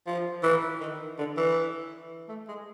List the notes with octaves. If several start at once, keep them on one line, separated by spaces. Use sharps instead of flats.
F3
E3
D#3
D3
E3
A3
G#3